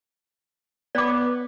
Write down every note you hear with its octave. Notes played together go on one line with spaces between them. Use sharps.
B3 D5 D6